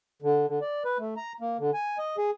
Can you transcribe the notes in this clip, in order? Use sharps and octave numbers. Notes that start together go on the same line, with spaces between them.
D3
D3
D5
B4
A3
A#5
A#3
D3
G#5
D#5
G#4